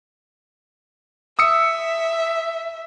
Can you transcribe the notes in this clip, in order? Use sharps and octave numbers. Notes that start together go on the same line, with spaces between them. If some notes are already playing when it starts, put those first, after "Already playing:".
E5 D#6 E6 C#7